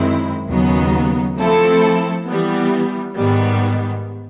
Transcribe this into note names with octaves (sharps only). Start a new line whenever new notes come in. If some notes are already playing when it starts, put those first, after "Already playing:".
Already playing: F#2 D#3 G#3 C4 E4
D#2 C#3 F#3 B3 D#4
F3 A3 C4 E4 A4
E3 G3 B3
G#2 D#3 G3 B3